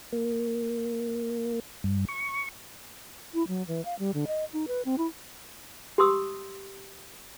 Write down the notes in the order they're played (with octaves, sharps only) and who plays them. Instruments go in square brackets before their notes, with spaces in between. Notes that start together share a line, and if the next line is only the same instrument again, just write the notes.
[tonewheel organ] A#3
G2
C#6
[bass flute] E4
F#3
E3
F5
G3
D3
D#5
D#4
B4
C4
E4
[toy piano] G4 C6 D#6 E6